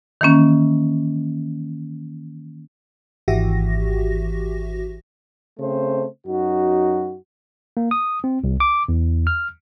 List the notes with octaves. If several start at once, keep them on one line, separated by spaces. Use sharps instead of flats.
D#3 E3 A#3 C#4
G#1 E3 F#4 G4 E5 A#6
C#3 A3 C4 C5
F#2 D#4 F#4
A#3
D#6
C4
C2
D6
E2
F6